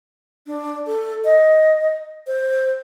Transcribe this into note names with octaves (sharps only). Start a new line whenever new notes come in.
D4
A4
D#5
C5